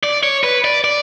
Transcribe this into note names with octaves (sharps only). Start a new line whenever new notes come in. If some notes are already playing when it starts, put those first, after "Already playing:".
D5
C#5
B4
D5
D5